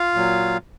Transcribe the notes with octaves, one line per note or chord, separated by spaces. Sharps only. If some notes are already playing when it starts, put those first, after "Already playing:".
Already playing: F4 F5
A#2 F#3